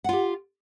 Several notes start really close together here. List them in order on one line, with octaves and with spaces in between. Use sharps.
F#5 F4 G4